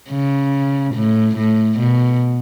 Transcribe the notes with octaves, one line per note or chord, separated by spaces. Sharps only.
C#3
A2
A2
B2